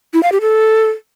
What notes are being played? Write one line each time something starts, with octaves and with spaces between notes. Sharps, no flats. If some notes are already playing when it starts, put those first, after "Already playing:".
E4
F5
G4
A4